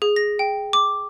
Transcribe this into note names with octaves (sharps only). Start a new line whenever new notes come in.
G#4
A#6
G5
D6